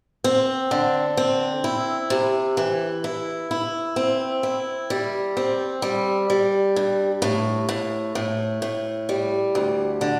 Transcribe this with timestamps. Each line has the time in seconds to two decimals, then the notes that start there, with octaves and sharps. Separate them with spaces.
0.24 C4
0.71 D3
1.17 C4
1.64 E4
2.10 C3
2.57 E3
3.04 E4
3.51 E4
3.96 C4
4.43 E4
4.90 G3
5.37 C4
5.82 G3
6.30 G3
6.76 G2
7.22 A2
7.69 A2
8.15 A2
8.62 A2
9.09 G3
9.55 D2
10.01 D3